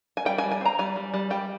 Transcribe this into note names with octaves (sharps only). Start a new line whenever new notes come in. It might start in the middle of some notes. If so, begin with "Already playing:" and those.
G#5
G3 G5
G#5
G3
G#5
C4 A#5
G3 G#5
G3
G3
G3 G5